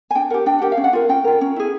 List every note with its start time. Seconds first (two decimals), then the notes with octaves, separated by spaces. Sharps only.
0.11 G#5
0.15 D4 G5
0.30 A#4 F#5
0.34 G4
0.46 D4 G5
0.59 G4 A#4 F#5
0.72 F5
0.77 C#4
0.84 F#5
0.93 F4 A#4
1.09 C#4 G5
1.24 F4 A#4
1.41 C#4
1.56 E4 G#4